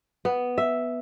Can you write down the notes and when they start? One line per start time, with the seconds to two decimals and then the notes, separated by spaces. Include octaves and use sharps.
0.25 B3
0.58 E5